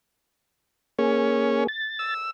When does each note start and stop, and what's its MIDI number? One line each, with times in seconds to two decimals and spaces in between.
0.99 1.67 58
0.99 1.64 61
0.99 1.67 68
1.68 2.14 93
1.99 2.31 88